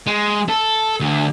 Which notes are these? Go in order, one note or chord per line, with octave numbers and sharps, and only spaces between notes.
G#3
A4
D2